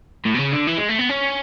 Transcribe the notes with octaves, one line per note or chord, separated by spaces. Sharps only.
A2
B2
C#3
D3
E3
G#3
A3
B3
C#4